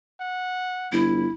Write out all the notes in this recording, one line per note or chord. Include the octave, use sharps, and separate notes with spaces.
F#5
G1 E4